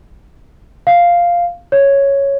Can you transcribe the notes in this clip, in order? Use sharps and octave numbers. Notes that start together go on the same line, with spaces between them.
F5
C#5